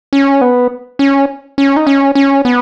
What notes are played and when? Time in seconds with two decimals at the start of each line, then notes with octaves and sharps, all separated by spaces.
0.13 C#4
0.41 B3
0.99 C#4
1.58 C#4
1.76 D#4
1.87 C#4
2.15 C#4
2.45 B3